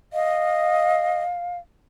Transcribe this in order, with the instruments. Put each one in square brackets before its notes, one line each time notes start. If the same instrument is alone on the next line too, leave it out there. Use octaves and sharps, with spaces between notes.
[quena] D#5 [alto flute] F5